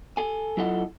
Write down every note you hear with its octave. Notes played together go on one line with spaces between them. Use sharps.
A4 G#5
F#3 E4 F4 A4 D#5 F#5